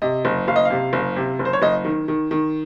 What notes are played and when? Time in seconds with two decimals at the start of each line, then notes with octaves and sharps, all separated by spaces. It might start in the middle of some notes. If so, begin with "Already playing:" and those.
0.02 C3 D#5
0.25 F#1
0.48 F#1 F5
0.56 D#5
0.65 F5
0.71 C3
0.93 F#1
1.16 C3
1.39 F#1
1.45 C5
1.53 C#5
1.62 F#1 D#5
1.85 D#3
2.08 D#3
2.31 D#3